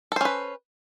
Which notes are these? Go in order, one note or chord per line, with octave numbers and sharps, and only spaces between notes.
C#4 A4 B4 C5